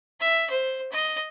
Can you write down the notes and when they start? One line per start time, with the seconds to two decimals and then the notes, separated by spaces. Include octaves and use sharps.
0.20 E5
0.51 C5
0.92 D#5